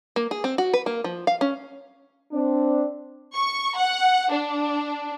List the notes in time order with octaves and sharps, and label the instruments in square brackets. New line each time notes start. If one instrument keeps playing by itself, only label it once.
[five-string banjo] A#3
G#4
C4
F#4
B4
A#3
F3
F5
C#4
[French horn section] C4 D4
[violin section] C#6
F#5
D4